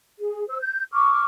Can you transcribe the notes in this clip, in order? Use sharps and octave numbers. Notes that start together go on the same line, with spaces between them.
G#4
C5 E6
G6
C#6 D6 E6 F6